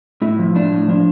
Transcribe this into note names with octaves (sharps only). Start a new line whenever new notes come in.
A2 E4
F3
A2 D4
A2
F3 D4